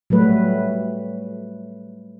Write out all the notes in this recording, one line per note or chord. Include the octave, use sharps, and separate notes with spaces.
F#3 G3 A3 B4